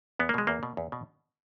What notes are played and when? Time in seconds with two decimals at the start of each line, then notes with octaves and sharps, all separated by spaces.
0.19 E2 B3
0.29 A#3
0.34 B2 G#3
0.47 E2 A#3
0.63 B2
0.77 E2
0.92 B2